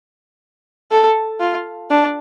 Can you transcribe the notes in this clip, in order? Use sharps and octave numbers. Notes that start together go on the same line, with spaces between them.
A4
F4
D4